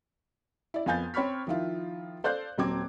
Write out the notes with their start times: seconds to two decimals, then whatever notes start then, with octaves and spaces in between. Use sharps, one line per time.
0.74 E4 D5
0.86 F2 B3 F5 G#5 G6 A6
1.14 C4 C#5 B5 C#6 F6 B6
1.47 D#3 F3 E4 F4
2.24 A4 C5 D5 F5 F#6 G6
2.58 D#1 F#3 C4 D6 G#6